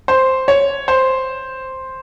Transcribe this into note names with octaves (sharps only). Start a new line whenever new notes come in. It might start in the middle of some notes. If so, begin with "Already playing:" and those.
C5
C#5
C5